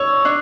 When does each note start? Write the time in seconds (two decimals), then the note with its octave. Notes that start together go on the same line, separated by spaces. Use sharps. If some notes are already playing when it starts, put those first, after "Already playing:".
Already playing: C#5 E6
0.25 D4